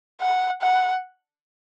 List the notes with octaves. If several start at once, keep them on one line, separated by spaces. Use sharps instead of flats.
F#5
F#5